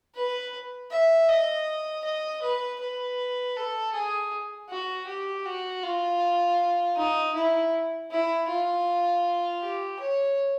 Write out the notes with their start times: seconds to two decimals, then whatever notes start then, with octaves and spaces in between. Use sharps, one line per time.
0.15 B4
0.91 E5
1.28 D#5
2.04 D#5
2.42 B4
2.80 B4
3.56 A4
3.94 G#4
4.70 F#4
5.07 G4
5.45 F#4
5.83 F4
6.97 D#4
7.35 E4
8.11 E4
8.49 F4
9.62 G4
10.00 C#5